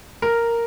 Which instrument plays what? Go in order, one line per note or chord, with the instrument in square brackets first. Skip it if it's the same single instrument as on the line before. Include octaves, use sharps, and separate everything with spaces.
[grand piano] A#4